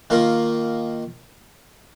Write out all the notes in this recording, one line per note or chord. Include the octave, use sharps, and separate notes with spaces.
D#3 A#3 F4 A#4